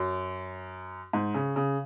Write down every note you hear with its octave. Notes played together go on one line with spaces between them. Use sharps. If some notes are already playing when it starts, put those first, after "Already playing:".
Already playing: F#2
G#2
C#3
C#3